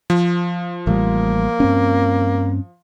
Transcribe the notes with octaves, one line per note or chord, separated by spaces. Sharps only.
F3
A1 G3 A#3
G2 C4 C#4